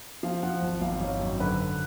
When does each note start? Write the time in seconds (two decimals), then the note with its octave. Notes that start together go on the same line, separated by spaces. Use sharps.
0.23 F3 F5
0.43 F3 F#5
0.62 G#1
0.81 G#1 F5
1.01 G#1 C#5
1.20 F#2
1.40 D3 B4